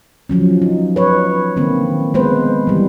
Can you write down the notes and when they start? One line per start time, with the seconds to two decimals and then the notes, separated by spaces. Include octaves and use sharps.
0.29 F3 F#3 C#4
0.62 D#4
0.96 B4 C#5
1.57 D3 D#3 A#3 C4
2.14 G#3 B3 B4 C5
2.67 E3 G3